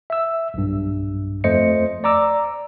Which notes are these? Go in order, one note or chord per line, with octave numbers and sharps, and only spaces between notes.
E5 E6
B1 G2
F2 A3 C5 D#5 C#7
D5 A#5 D6 E6